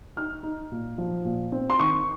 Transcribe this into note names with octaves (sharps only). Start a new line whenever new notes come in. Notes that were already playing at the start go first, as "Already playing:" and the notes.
D#4 F6
D#4
A#2
F3
A#2
C4
C6
D#3 C#6